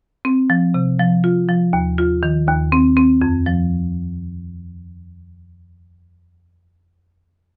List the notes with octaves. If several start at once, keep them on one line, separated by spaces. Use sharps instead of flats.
C4
F3
C3
F3
F4
F3
D#2
F4
D#3
D#2
C4
C4
F2
F3